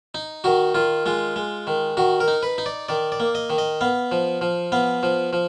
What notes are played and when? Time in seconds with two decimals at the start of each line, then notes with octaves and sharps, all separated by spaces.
0.15 D#4
0.44 D#3 F#4
0.75 D#3 F4
1.06 G#3 F4
1.36 G#3
1.67 D#3
1.97 D#3 F#4
2.20 A#4
2.28 D#4
2.43 B4
2.58 D#4
2.66 D5
2.88 D#3 D5
3.12 D5
3.20 A#3
3.35 D#5
3.50 D#3
3.58 D#5
3.81 B3 F5
4.12 F3
4.41 F3
4.72 B3 F5
5.03 F3
5.33 F3